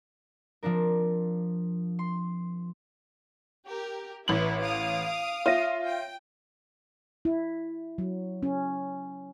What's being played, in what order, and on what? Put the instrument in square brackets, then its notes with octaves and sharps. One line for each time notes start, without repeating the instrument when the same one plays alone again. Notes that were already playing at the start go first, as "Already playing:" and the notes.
[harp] F3 C4 D4 A#4
C6
[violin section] G4 A#4
[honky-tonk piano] A1 F#7 [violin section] E4 B4
[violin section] F5 D#6 D7
[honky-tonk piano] F4 D#7 [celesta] C#5 E5 A#6
[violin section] G5
[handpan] E4
F#3
C#4